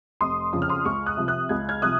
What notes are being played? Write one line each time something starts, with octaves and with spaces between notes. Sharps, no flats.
F1 C6 D#6
F2 C#3 F3 D#6
F6
C6 D#6
C#2 C#6 F6
D#6 F#6
C3 F3
D#6 F#6
C#2 G#6
F6 G#6
C3 F3 D#6 F#6